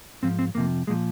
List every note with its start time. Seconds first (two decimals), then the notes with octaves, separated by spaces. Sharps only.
0.23 G#2 F3 C4
0.39 C4
0.55 F2 C3 F3 A#3
0.87 A#2 F3 G#3